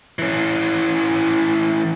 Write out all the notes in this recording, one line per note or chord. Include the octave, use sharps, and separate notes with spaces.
E3 C#4